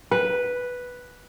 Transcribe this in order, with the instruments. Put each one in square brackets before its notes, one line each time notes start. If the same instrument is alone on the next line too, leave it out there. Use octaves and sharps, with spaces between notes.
[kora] B4